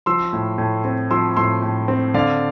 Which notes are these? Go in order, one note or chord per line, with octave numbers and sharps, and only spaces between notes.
F3 C6 E6
A2
A2
C4
F3 C6 E6
A2 C6 E6
A2
C4
D3 D5 F5